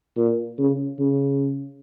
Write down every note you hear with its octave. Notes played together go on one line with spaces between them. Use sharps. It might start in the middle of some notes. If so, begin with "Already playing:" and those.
A#2
C#3
C#3